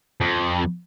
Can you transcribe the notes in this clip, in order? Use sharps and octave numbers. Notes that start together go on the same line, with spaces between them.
F2